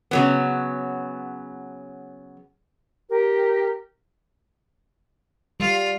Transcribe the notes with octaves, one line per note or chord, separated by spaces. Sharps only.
C#3 F#3 B3
G4 A#4
G3 F4